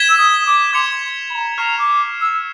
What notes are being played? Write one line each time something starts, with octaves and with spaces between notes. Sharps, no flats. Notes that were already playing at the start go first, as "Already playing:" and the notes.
Already playing: G#6 B6 E7 G7
E6
D#6
D6
C6 G#6 C#7 F7
B5
A#5
A#5 C#6 F6 G#6 C7 E7
D6
E6